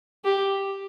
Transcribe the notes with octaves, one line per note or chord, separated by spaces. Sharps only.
G4